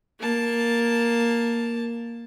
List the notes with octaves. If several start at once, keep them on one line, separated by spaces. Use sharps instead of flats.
A#3 A5